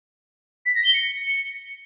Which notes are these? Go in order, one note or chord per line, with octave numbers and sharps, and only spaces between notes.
B6
A#6
G7
C#7